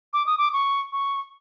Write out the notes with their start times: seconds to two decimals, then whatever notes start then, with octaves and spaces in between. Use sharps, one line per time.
0.13 D6
0.26 D#6
0.38 D6
0.53 C#6
0.93 C#6